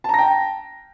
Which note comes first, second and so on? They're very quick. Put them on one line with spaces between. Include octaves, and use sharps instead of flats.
A5 A#5 A#6 G5